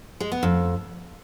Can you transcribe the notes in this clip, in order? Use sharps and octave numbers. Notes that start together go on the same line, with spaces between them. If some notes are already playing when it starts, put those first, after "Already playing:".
G#3
B3
F2